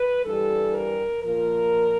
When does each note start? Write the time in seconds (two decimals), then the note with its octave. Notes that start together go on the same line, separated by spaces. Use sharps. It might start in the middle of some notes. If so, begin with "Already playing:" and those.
Already playing: B4
0.25 G2 E3 G3 A4
0.75 A#4
1.23 A#2 F3 A#4